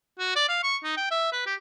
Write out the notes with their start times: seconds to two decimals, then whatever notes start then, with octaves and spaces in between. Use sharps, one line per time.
0.19 F#4
0.36 D5
0.48 F5
0.63 C#6
0.84 D#4
0.97 G5
1.11 E5
1.33 B4
1.46 G4